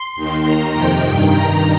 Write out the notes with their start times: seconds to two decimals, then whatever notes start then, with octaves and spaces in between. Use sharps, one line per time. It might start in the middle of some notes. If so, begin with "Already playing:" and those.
Already playing: C6
0.16 D#2 D#3
0.44 D#2 D#3 A#5
0.74 F2 C3 D#3 G5
1.02 G2 D#3
1.31 G2 D#3 A#5